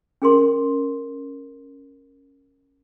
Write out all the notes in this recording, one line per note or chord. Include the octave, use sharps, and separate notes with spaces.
C#4 G#4 A#4 C6